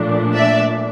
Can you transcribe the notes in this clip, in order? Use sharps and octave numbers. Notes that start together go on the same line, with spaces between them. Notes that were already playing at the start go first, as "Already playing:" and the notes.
Already playing: A#2 F3 A3 D4
D5 E5